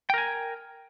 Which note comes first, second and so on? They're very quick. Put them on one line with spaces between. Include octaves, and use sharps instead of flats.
G5 A#4 G#5